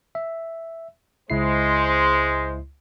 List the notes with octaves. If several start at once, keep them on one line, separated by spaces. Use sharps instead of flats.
E5
C#2 G#3 E4 C5 C7